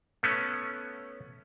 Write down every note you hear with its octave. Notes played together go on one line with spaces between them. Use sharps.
A3 B3 C#4